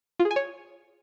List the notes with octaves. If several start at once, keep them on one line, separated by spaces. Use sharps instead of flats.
F4
G#4
G#5
C#5